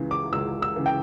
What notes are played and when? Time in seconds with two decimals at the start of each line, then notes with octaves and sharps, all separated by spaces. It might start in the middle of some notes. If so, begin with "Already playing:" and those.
Already playing: C#2 C#3 E3
0.11 D6
0.33 C#2 E6
0.62 E6
0.76 C#3 E3
0.86 G5